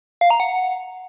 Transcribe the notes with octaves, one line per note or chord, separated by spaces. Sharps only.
F5
A#5
F#5